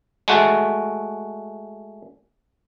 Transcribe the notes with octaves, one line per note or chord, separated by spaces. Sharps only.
G#3 A3 F#4